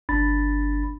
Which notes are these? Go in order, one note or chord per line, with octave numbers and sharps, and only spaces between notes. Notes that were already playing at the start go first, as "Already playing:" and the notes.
G1 D4 B5 A6